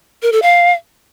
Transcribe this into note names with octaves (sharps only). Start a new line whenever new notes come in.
A#4
A4
F5